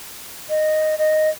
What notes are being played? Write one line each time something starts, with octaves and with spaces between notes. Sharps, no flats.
D#5
D#5